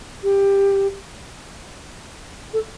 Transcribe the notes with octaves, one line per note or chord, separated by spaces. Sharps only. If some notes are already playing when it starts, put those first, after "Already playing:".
G4
A4